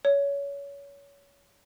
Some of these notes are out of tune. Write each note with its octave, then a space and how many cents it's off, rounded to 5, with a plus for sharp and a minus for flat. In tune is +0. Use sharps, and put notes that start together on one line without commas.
C#5 +25